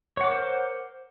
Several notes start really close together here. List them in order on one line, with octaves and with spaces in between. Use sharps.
C#5 F#5 D6 A#4 C5